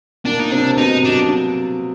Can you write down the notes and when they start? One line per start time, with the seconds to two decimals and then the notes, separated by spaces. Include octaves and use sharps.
0.25 A#2 A#3 D4
0.40 D#4
0.51 C3 C4 D4
0.78 B2 B3 D#4
1.04 F#3 D4